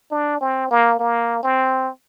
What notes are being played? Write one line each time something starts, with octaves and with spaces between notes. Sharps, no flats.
D4
C4
A#3
A#3
C4